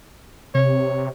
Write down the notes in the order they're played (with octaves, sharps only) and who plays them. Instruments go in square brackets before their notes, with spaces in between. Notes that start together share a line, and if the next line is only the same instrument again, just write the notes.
[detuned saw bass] C3 [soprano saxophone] C#5